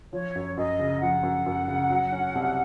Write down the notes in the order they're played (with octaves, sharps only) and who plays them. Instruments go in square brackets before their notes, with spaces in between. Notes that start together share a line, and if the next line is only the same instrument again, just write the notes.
[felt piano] F3 [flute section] C#5
[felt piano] F#2
[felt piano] F#2 [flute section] D#5
[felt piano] C#3
[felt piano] F3 [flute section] F#5
[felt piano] F#2
F#2
C#3
F#3
C#4
C2